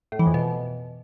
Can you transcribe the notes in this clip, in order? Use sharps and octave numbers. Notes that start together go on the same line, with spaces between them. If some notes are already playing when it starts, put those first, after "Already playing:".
A2
E3
F2
B2